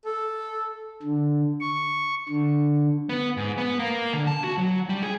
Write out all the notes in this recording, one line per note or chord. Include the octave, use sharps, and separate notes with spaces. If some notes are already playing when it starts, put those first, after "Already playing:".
A4
D3
C#6
D3
B3
G#2
B3
A#3
D3
A5
F#4
F#3
G3
G#4